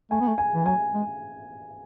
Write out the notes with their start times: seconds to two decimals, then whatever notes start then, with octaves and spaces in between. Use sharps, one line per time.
0.11 A3 G#5
0.20 B3
0.28 A3
0.38 G#5
0.54 E3
0.66 F#3 G#5
0.94 G#3